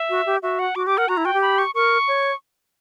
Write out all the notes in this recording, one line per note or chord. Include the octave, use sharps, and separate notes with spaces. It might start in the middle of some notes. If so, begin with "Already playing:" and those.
Already playing: E5
F#4
G4
F#4 E5
F#5
F#4 D6
G4 D6
A#4 F#5
F#4 A#5
E4
F#4 G5
G4
B5
C#6
A#4 C#6
C#5